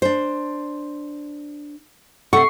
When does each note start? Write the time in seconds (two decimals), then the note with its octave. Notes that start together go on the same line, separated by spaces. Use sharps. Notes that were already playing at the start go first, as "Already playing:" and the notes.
0.02 D4 C5
2.33 C3 A4 F#5 C#6 C7